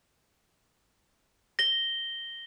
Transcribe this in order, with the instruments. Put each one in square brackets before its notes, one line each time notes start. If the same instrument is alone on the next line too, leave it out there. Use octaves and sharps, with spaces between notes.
[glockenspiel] A#6 G7